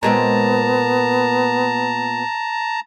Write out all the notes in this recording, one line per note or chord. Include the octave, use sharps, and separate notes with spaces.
A#2 G#3 B3 C4 A5 A#5